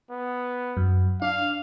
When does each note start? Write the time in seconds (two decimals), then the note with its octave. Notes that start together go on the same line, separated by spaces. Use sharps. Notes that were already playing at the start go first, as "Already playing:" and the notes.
0.11 B3
0.77 F#2
1.22 D4 F5